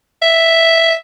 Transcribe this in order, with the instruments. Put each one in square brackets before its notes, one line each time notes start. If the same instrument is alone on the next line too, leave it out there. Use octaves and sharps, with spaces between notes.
[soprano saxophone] E5